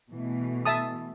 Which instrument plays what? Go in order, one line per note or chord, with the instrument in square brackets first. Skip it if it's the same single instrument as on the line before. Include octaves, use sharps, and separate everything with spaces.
[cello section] B2 E3 A3
[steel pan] E5 A5 D#6